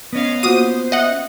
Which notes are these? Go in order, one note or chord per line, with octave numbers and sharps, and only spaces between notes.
B3 C#4 D#5 F5
A#3 F4 F#4 C5 D#6 D#7
D#5 E5 F#5